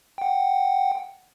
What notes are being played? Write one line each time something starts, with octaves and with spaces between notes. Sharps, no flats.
F#5 G5